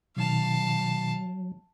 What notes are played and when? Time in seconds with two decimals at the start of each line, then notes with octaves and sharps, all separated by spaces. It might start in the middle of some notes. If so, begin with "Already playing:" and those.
0.17 B2 D#3 F#3 F5 A5